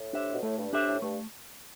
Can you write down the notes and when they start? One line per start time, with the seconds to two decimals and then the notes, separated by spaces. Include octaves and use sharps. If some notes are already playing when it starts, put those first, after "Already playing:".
Already playing: A2
0.13 D4 G4 C5 E5
0.32 B2
0.43 A2 A3
0.58 G2
0.73 A2 D4 G4 C5 E5
0.87 A2
1.02 G2 A3